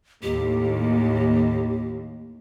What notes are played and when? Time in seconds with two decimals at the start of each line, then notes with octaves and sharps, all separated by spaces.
0.23 D#2 A2 G4